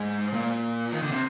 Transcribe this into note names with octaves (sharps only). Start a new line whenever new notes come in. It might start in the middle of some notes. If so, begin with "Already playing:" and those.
Already playing: G#2
A#2
D#3
D3
C3